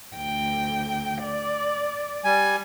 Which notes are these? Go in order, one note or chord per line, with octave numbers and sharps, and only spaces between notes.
D2 G5
D5
G3 G#5